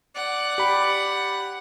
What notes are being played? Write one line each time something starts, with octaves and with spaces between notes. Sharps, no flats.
D5 F#5
G4 B5